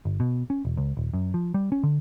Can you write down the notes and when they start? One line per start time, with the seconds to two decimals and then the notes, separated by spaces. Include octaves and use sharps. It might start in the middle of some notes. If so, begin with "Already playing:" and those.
0.05 G1
0.20 B2
0.50 C#4
0.65 E1
0.77 C#2
0.97 D#1
1.13 F#2
1.34 F3
1.54 G3
1.72 C#4
1.83 D3